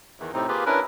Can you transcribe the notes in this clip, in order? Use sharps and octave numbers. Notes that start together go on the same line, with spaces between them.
E2 D#3 E3
A2 C3 C4 D#4
A#3 F4 G4 G#4 B4
C#4 D4 E4 A#4 B4